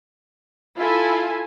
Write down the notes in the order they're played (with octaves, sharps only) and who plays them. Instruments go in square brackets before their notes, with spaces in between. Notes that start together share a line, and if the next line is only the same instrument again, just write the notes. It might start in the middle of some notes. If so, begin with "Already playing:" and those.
[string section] E4 G#5 [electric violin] F4 A4